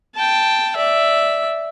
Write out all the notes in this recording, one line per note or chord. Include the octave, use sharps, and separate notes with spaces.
G5 A5
D5 E5